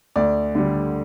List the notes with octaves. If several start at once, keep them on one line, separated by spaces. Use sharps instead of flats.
D2 D5
D3 G3